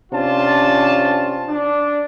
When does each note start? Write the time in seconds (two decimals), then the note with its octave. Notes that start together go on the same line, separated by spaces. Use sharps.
0.12 C3 C#4 D4 F4 A5
1.49 D4